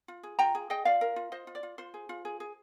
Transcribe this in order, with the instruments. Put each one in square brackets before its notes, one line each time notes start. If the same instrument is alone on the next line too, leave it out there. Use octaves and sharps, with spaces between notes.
[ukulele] F4
G#4
F4 G5 A#5
G#4
G#4 D#5 G5
F4 D5 F5
A#4
F4
F4 C5 D#5
F4
D5
F4
F4 C5
G#4
F4
G#4
G#4